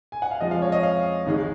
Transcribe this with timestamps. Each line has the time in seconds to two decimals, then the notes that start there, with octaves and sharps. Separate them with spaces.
0.12 G#5
0.22 F#5
0.31 F5
0.40 F2 F3 G#3 D#5
0.51 F5
0.62 C#5
0.72 D#5
0.83 F5
1.26 G#1 G#2 D#3 G#3